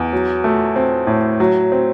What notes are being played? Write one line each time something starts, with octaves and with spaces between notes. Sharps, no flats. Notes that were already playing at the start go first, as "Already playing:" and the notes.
Already playing: E2
F#3
A3
C4
A2
F#3
C4